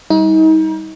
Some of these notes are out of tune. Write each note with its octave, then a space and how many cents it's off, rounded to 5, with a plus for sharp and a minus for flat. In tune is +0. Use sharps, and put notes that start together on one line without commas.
G3 +0 D#4 +35